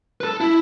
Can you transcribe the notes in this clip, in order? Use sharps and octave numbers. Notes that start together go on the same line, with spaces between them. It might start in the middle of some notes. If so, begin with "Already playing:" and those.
B4
A4
E4